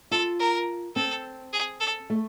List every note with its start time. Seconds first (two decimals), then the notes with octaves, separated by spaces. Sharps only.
0.11 F4 A4
0.39 A#4
0.95 C4 A4
1.53 G#4
1.80 A4
2.10 A3